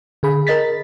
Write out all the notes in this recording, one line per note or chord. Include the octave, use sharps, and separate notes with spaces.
D3 G#4 B5
A#4 D#5 A6 B6